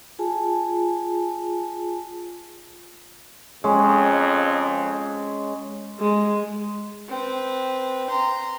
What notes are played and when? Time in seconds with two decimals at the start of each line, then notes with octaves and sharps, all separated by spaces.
0.19 F4 G#4 G#5 A5
3.64 F2 G#3 C#4
5.99 G#3
7.09 C4 B4
8.08 A#5 C6